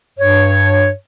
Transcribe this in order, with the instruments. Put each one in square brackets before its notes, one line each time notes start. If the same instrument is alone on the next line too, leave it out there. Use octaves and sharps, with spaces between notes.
[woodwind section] G2 C#5